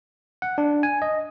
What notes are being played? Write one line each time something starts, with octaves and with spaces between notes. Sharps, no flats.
F#5
D4
G#5
D#5